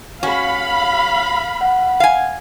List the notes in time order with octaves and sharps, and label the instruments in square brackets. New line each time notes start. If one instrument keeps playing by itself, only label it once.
[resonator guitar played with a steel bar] C#4 F#4 [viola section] F5 B5
[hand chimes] F#5
[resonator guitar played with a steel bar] F5 G#5